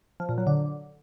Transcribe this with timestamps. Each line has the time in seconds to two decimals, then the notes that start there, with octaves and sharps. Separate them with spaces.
0.20 F3
0.29 A#2
0.38 F#3
0.47 D3